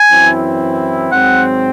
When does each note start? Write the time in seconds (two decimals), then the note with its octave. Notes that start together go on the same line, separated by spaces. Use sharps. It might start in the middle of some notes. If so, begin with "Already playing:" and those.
Already playing: G#5
0.10 F#2 E3 C4 E4
1.12 G#2 F#3 C4 F#5